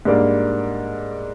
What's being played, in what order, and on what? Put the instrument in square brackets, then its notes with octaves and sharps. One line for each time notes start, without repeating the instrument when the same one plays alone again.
[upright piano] G#2 G3 A#3 D4